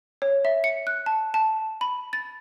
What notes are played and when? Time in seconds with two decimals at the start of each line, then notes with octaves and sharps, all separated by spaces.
0.22 C#5
0.45 E5
0.64 C#7
0.87 F#6
1.06 A5
1.34 A5
1.81 B5
2.13 A6